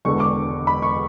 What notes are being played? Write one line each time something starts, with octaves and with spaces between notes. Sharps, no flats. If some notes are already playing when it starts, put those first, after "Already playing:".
E1 E2 D3 G#3 C#6
D6
B5
C#6